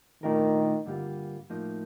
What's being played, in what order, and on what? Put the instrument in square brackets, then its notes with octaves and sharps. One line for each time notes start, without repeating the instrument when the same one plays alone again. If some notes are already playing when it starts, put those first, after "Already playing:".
[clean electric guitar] A#2 A3 D4 F4 A#4 [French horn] D#3
[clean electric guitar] G2 D3 G3 A#3 F4
A2 F3 A#3 D#4